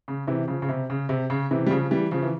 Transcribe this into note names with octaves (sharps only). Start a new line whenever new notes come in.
C#3
C3 E3
C#3 F3
C#3
C3
C#3
C3
C#3
C3 E3
G3
C#3 F3
E3 G3
C#3 F3
E3